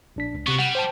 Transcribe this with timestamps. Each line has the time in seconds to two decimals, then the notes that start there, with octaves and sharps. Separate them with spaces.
0.16 A#1 D4 B6
0.35 C#2
0.47 C3 B3 F#4 C#6
0.59 G3 F#5
0.75 C5 G5 A5